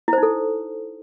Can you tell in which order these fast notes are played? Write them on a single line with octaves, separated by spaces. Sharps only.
E4 C5 D#4 A4